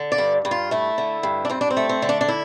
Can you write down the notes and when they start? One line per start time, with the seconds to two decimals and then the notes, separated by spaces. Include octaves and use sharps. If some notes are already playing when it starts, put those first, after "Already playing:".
Already playing: D3
0.12 D5
0.18 G2
0.45 G2
0.51 F4
0.71 A3 E4
0.98 D3
1.23 G2
1.45 D4
1.49 G2 C4
1.61 D4
1.70 C4
1.77 A3
1.89 C4
2.02 D3
2.09 D4
2.21 D4
2.28 E4